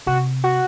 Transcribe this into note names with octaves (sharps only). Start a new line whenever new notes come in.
C3 F#4
F#4